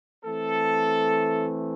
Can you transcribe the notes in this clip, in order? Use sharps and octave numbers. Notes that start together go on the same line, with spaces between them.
E3 A3 C4 A4